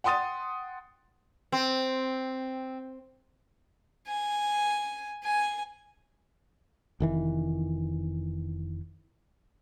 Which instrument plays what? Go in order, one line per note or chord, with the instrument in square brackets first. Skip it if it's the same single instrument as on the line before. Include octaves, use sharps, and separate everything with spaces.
[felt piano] F#5 G5 C6 D#6 A6 D#7
[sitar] C4
[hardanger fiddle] G#5
G#5
[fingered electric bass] F1 D#3 E3